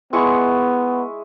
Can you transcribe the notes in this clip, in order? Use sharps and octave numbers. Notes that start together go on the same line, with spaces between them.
G#3 B3 E4 C#6